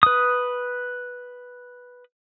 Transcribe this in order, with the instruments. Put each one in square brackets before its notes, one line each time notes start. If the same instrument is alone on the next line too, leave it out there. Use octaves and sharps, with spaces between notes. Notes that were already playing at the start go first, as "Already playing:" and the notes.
[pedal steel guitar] B4 D#6